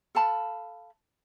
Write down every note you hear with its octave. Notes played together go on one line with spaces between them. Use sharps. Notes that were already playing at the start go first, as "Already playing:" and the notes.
A4 F5 A5 B5